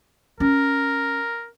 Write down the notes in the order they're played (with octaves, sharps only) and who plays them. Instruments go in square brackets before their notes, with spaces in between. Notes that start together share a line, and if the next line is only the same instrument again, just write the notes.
[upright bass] C#4 [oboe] A#4